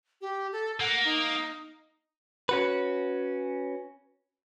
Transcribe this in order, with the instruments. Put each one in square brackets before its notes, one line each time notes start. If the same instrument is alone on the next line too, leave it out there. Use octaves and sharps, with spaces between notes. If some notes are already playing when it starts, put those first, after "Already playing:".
[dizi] G4
A4
[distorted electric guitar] A#3 [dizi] F#5
[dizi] D#4
[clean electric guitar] C#4 F#4 B4